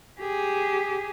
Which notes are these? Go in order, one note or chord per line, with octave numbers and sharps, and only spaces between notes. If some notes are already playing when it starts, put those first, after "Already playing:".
G4 G#4